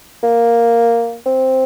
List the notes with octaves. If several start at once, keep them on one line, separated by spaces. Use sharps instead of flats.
A#3
C4